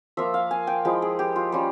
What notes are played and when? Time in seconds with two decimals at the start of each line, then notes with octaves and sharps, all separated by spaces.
0.17 F3 A#3 F4 E5
0.34 F5
0.51 G#5
0.67 G5
0.85 F3 G#3 E4 G5
1.02 G#4
1.19 G4
1.36 F4
1.52 G3 C#4 F4